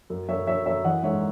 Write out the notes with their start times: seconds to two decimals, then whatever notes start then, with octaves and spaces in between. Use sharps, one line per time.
0.10 F#2
0.28 F#2 C#5 E5
0.47 F#2 C#5 E5
0.66 F#2 C#5 E5
0.84 E3 D#5 F#5
1.03 G#2 C#5 E5